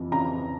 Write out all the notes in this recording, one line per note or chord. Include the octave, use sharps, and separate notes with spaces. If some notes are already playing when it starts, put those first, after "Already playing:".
Already playing: F2 E3
C#3 A#5